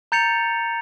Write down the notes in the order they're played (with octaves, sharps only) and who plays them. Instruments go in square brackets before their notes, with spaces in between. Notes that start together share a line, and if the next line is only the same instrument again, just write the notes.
[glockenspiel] A#5 G6 A6 C#7 F7